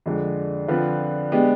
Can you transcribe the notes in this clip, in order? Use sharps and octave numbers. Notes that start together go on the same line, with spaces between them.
F2 D3 G#3
D3 F3 C4 F4 B4
G#3 B3 D4 G4